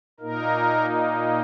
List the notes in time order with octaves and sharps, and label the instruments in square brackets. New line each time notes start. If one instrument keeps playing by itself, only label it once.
[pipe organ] A#2 A#3 D#4 A#4